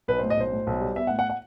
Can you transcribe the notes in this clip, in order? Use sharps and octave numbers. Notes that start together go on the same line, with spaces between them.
B1 B4
A2 C5
D#5
B1 C5
A2
B1
G3
B3 E5
F#5
A2
F#5
F#5